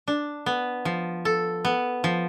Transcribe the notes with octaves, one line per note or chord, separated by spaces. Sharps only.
D4
B3
F3
A4
B3
F3